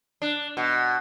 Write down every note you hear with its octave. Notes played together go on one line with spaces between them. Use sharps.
D4
B2